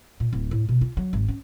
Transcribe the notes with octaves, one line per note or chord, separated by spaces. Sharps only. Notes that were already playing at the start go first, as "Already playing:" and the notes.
A#2
D1
A2
B2
F4
F#3
G#1
C#4